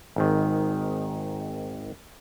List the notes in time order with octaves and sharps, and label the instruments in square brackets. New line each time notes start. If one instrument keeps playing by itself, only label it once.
[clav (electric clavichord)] G#1 G#2 D#3